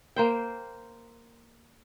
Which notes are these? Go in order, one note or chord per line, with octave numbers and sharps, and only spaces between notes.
A#3 C5 G5